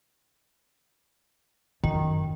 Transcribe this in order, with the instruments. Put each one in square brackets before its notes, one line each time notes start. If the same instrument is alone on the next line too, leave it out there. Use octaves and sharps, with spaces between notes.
[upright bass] F#2 [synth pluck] D#3